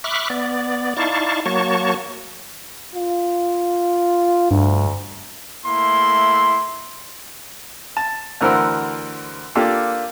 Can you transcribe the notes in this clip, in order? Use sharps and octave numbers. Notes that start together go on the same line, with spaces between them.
E5 B5 C#6 D6 F6 F#6
B3 D5
D#4 E4 D5 F5 A5 C#6
F#3 A#3 F#4 C#5 A5 C#6
F4
D2 G2
A3 A#3 E4 C6
A5
D2 E3 A#4 C5 F#5 E6
A#3 D4 F4 G4 A4